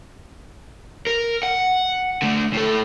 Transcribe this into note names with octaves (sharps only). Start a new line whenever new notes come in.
A#4
F#5
D3 A3
A2 A4